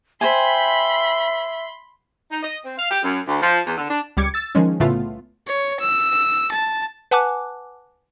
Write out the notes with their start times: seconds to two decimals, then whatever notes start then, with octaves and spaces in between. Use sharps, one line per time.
0.21 C5 E5 G5 G#5 B5 C6
2.30 D#4
2.42 D#5
2.63 C4
2.77 F5
2.90 G4
3.03 F#2
3.26 D2
3.41 F3
3.65 E2
3.77 D3
3.89 D4
4.17 C#2 G3 D6 G#6 C#7
4.34 E6 A6
4.55 D#3 F3 G#3 C#4
4.80 C2 A2 C#3 A3 B3 F4
5.47 C#5
5.80 E6
6.52 A5
7.11 B4 F#5 G#5 A5 D6 F#6